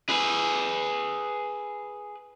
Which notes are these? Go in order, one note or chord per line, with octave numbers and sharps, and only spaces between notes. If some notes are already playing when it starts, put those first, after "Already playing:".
G#4 B4